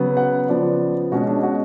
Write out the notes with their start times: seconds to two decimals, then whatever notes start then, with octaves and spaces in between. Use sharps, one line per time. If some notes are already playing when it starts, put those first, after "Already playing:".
Already playing: C#3 F#3 B3
0.17 F#5
0.49 C#3 F3 B3 D5
1.12 B2 G#3 C#4 F#4
1.27 D4
1.43 F#4